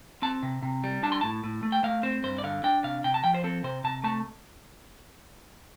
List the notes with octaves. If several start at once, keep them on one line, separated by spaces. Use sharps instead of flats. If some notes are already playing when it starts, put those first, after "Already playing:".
C4 A5
C3
C3
G3
D4 A5
C6
A2 A5
A2
A3
G5
A3 F5
C4 C5
G2 C5
D5
D3 F5
D4 G5
C3 F5
C3 G5
A5
F3 G5
C5
C4 A4
C3 C5
C3 A5
A3 A5